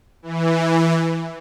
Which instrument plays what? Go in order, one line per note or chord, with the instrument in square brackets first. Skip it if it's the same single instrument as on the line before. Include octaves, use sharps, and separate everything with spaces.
[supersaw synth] E3